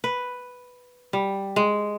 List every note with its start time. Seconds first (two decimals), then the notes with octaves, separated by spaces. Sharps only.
0.04 B4
1.13 G3
1.56 G#3